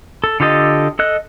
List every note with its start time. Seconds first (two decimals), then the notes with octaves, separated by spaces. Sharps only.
0.24 A4
0.40 D3 F4 G4 A4 D#5
0.99 A4 D#5 F#6